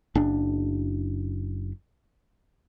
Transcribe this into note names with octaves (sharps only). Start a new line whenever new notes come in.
F#1 D4